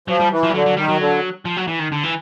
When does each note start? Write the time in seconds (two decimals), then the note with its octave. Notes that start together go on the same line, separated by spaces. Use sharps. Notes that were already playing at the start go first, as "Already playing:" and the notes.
0.08 F3 F#3
0.20 G3
0.31 E3
0.43 F3
0.50 G3
0.54 D3 F#3
0.66 F#3
0.77 D#3 G3
0.89 F#3
0.99 D3
1.45 F3
1.57 F#3
1.68 E3
1.79 D#3
1.92 D3
2.04 E3